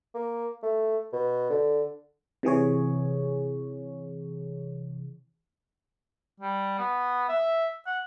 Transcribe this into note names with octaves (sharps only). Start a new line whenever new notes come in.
A#3
A3
B2
D3
C3 E3 G#4 C#5
G3
B3
E5
F#5